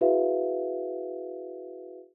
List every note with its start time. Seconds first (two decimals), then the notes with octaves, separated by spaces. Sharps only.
0.01 E4 F#4 G#4 B4 E5 F5